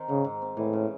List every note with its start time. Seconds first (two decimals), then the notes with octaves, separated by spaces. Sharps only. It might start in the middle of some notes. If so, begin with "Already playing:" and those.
Already playing: D#3 C4
0.09 G#2 C#3
0.25 G#2
0.42 C4
0.57 A2 E3
0.73 C#3